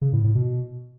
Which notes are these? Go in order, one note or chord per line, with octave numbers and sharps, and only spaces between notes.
C#3
A2
A2
B2